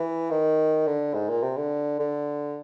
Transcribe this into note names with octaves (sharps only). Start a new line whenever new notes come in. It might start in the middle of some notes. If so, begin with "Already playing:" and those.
Already playing: E3
D#3
D3
G#2
A#2
C3
D3
D3